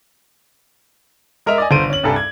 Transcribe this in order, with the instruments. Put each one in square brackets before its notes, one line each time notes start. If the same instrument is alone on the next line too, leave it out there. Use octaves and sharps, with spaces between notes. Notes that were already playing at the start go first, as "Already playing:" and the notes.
[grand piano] G#3 A#4 D#5 E5 F7
D5 D#5 G#5
G1 C5 D7 D#7
C#4 F#7
C2 G2 G3 A4 G#5
G#6